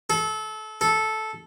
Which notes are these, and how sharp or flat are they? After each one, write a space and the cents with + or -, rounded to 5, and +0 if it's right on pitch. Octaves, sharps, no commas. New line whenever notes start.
A4 -25
A4 -10